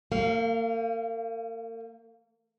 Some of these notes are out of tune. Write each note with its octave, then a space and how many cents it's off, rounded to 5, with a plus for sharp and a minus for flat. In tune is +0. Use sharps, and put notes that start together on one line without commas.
A#3 -40 F5 +0